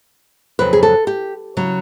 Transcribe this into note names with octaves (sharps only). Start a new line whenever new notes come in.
F2 C#3 F#3 B4
G#4
A4
G4
C#3 F#3